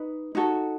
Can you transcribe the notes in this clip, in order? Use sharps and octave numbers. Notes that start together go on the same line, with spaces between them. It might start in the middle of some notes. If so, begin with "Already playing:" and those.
Already playing: D#4 B4
D#4 F#4 A4